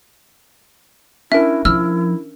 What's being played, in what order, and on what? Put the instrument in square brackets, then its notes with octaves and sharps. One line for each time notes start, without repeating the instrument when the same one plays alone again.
[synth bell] C#4 D4 A#4 [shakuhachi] E4 [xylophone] E5
[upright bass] F3 [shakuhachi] E4 [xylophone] E6 F6